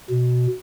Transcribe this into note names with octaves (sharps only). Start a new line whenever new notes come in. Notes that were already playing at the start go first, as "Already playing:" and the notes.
B2